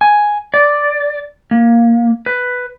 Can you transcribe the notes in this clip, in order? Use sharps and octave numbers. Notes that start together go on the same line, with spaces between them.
G#5
D5
A#3
B4